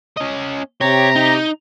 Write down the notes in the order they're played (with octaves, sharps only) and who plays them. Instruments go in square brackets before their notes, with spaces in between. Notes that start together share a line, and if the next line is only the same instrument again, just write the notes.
[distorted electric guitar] C#4 D#5
[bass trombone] C3 [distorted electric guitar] G4 [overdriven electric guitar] C#5 [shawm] A#5
[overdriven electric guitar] D#4